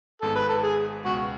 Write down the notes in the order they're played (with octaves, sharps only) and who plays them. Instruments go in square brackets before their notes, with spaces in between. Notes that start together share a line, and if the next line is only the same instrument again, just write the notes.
[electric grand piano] G#1 G#2 G#3 B3 [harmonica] A4
[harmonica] B4
A4
G#4
[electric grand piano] C#2 B2 G#3 [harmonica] F#4